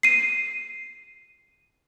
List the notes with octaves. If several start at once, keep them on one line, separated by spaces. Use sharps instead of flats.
C7 D#7